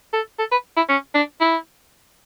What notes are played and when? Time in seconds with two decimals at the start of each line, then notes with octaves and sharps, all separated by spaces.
0.13 A4
0.39 A4
0.52 B4
0.77 E4
0.89 C#4
1.15 D4
1.41 E4